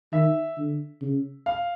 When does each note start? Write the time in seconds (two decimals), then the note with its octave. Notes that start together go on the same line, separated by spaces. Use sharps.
0.13 D#3 E5
0.58 D3
1.02 C#3
1.46 F5